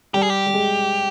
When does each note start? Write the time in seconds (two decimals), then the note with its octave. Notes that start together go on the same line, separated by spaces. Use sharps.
0.14 G3 G4
0.22 G#4
0.30 G4
0.47 G3
0.54 G#3